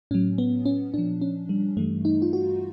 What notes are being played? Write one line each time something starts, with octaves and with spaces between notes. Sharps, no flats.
A2 F#3 C#4
B3
C#4
A#2 F3 D4
C#4
G3
G2 E3 G3 A3
D#4
F4
F#4